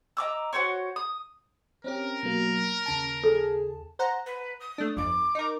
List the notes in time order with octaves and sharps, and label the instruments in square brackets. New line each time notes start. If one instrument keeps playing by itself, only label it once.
[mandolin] D#5 A#5 D6 E6
F#4 A#4 C5 C#5
D#6
[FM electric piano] C4 C#4 G4 [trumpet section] A#4
[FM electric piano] B2 F#3 A#3
D#2 C#3 A5
[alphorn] G#4 [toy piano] A4
[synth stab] C5 F#5 A#5
[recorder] B4
D#6
[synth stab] A3 D4
[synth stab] G1 F2 [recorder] D6
[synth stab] D#4 A#4